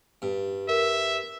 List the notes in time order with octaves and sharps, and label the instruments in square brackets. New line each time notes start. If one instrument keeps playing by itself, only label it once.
[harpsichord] G2
[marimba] A#4 [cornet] E5